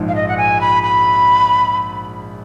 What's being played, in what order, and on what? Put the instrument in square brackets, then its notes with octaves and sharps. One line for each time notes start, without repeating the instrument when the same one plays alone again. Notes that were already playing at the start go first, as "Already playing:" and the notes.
Already playing: [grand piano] A#1 G#2 F3
[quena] F5
D#5
F#5
G#5
B5
B5